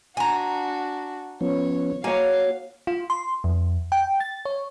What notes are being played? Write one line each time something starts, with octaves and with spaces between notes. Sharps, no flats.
D4 F#4 G#5 A#5
F3 B3 C#4 C#5
A#3 F#4 C#5 F5 G#5
F4
C6
F2
G5
A6
C#5